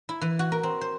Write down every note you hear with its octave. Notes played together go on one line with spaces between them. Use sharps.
E4
E3
F#4
A#4
C4
C5